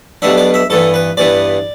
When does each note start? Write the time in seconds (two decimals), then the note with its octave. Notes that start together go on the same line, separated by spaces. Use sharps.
0.22 B1 B2 G3 B3 D4 E5
0.38 D5
0.54 E5
0.70 G2 E3 B3 A4
0.94 B4
1.17 G2 E3 B3 D5